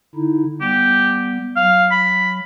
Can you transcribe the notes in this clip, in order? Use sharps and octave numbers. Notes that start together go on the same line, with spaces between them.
D3 D#4 E4
G3 B3 G4
F#3 F5
B5